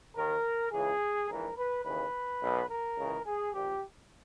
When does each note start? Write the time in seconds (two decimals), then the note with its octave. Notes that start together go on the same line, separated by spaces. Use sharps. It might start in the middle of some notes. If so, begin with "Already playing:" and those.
0.16 D#2 D#3 A#4
0.72 C#2 C#3 E3 G#4
1.29 A#1 G#2 E3 A#4
1.57 B4
1.84 D#2 C#3 E3 B4
2.41 B1 B2
2.69 A#4
2.97 C#2 C#3 E3
3.25 G#4
3.53 A#1 A#2 G4